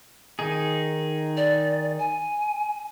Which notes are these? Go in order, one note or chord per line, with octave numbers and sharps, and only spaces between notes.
D#3 D#4 G#4
D5
G#5